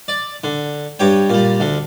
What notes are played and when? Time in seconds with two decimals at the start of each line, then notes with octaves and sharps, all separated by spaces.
0.08 D5
0.44 D3
0.99 G2 G4 C#5 G5
1.30 A#2 G3
1.60 D2 D3